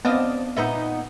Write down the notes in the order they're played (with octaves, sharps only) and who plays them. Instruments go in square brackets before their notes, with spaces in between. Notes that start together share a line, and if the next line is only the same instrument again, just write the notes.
[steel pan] B3 C4 [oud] D4 D#5 F5
[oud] A#2 B3 D#4 [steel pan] E5